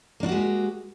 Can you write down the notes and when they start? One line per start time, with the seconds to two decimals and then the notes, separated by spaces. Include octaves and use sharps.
0.20 A#3
0.23 D4
0.26 F#4
0.29 G4
0.32 G#3